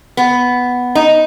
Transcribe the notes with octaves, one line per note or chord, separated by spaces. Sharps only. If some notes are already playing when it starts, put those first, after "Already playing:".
B3
D#4